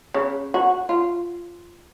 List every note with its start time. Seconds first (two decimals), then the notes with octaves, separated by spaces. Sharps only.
0.14 C#3
0.54 F#4
0.89 F4